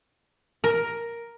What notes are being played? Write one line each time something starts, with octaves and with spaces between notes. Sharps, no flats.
A#4